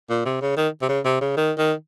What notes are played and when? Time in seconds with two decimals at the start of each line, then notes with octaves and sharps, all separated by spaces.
0.10 A#2
0.26 C3
0.42 C#3
0.57 D#3
0.82 C3
0.89 C#3
1.05 C3
1.21 C#3
1.37 D#3
1.58 D#3